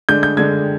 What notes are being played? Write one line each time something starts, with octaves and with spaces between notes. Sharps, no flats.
D3 G#3 D4 G6
G6
D3 G#3 D4 G#6